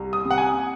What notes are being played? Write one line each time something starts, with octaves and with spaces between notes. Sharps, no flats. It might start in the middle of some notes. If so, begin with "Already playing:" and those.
Already playing: C2
D#6
C3
F#5
G#5